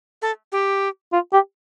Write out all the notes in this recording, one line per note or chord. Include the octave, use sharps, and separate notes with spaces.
A4
G4
F4
G4